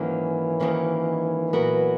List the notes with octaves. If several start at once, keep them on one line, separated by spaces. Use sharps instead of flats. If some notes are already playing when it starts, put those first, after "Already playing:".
Already playing: G#2 D#3 E3 F#3 A#3 C#4
G#2 D#3 F#3 A#3 C#4
A#2 F#3 B3 F#4 A#4